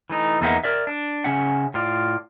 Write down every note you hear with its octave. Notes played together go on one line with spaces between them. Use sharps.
E3 A3 D#4
E2 A3 A#3 D#4 E5 F#5
A#4 D5 E5
D4
C#3 C#4 E5 F#5
A2 F4 D5